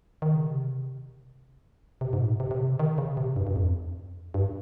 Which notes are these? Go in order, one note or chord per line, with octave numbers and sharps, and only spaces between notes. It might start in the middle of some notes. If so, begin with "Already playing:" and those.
D#3
C#3
C3
C3
G#2
A#2
C3
C3
C#3
D#3
C#3
C3
G2
G2
F2
G2